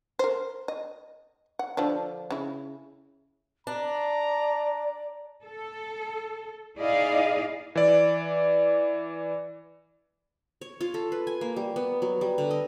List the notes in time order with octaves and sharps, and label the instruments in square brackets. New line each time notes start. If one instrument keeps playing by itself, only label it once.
[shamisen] A#4 C5
D#5
F#5
D3 F3 D4
C#3 E4
[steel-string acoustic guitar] D4 [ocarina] D5 [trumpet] A#5
[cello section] A4
D#4 E4 G#4 D5 D#5 F5
[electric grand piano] E3 D5
[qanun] C#5
F4
A4
B4
G#5
A#3
G3
B3
F#3
G3
D3
D#5